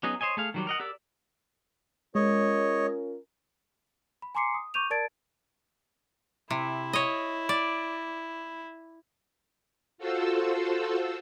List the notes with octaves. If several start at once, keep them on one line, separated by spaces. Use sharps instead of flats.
F#3 B3 C#4 D#4 G#4
C5 C#5 D#5 G#5
A3 G#4 F5
D#3 F#3 G3
A#4 D#5 F#5
G4 A#4 D5 E6
G#3 C#4 F4 A#4 C#5 D#5
B5
G#5 A#5 C6 D6 C7 C#7
D#6
C#6 D6 G6 D#7 F7
A#4 D5 A5 G#6 A6 D7
C3 E4
C#5 D#5
D5
F4 F#4 A4 C5 E6